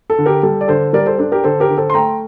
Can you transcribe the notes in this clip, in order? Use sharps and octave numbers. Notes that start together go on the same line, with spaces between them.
A4
D3
G4 A#4
G3 A4
D5
D3 A4 C5
G3 A#4 D5
A4 C5
D4 A4
G4 A#4
D3 A4 C5
G4 A#4
D3
A4 C5
C6
A3 G5 A#5